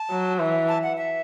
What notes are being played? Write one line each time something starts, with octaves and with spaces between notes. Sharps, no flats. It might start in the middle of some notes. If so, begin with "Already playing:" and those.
Already playing: A5
F#3
E3
A5
F#5
E5